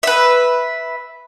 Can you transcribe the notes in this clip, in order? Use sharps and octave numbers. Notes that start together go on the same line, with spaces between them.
B4 E5